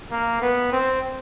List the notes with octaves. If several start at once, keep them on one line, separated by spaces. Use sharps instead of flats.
A#3
B3
C4